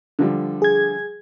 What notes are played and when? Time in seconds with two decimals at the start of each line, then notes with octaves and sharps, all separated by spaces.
0.19 D3 F3 G3
0.62 G#4 G#6